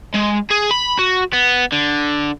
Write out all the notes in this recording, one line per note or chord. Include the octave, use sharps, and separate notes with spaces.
G#3
G#4
B5
F#4
B3
D3